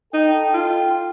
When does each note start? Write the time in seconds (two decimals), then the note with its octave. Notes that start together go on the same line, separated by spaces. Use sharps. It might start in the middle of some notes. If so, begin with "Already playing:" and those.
0.14 D#4 A4 G5
0.54 F4